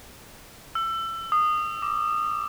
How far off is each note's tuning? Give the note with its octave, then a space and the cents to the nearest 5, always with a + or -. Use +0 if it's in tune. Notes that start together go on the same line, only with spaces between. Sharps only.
E6 +25
D#6 -20
D6 +0